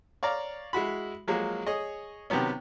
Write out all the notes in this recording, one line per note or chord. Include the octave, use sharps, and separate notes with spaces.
C#5 D5 F5 A#5
G#3 E4 F#4 B5
F3 F#3 G#3 A#3
G#4 C#5 D#5
C3 D#3 F#3 B3 C#4